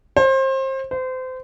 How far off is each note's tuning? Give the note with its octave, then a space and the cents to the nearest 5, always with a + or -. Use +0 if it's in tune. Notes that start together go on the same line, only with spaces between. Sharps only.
C5 +30
C5 -30